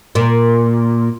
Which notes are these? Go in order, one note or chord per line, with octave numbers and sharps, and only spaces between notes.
A#2